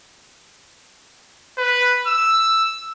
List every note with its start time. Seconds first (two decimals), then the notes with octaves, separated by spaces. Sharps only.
1.58 B4
2.07 E6